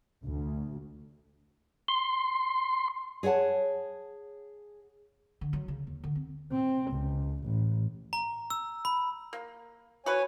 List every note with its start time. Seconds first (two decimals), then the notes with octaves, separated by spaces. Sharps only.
0.24 D2
1.88 C6
3.23 G#4 C#5 D5 F#5 A5
5.41 D3
5.53 F#3
5.68 C#3
5.87 D#2
6.04 D3
6.15 C4
6.52 C4
6.91 C#2
7.44 A1
8.13 A#5
8.50 E6
8.85 B5
9.33 A#3
10.06 F#4 B4 C#5 G#5